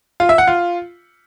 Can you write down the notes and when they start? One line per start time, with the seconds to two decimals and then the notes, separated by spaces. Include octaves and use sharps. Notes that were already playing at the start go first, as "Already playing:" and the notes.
0.20 F4
0.29 E5
0.38 F#5
0.47 F4